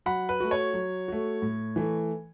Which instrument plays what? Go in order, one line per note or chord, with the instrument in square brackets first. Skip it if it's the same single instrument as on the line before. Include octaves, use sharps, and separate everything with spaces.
[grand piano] F#3 [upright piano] F#5 B5
[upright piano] B4
[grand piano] A3 F#4
[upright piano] C#5
[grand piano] F#3
A3 F#4
A2
E3 A3